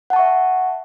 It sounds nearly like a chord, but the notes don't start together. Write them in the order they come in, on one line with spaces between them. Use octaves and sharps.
F#5 A5 C#6 E5